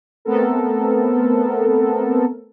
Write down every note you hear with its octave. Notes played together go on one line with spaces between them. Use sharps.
A3 B3 C4 A4 A#4